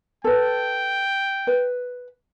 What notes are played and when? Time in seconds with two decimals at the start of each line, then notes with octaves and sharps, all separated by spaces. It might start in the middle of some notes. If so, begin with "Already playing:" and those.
0.24 A4 B4 G5
1.47 B4